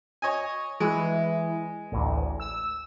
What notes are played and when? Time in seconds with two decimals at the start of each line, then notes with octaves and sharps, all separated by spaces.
0.22 C#5 D#5 G#5
0.80 E3 G#3
1.92 A1 D2
2.40 E6